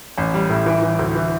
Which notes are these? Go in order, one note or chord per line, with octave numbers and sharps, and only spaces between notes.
A1
G3
A2
E3
E3
D2
E3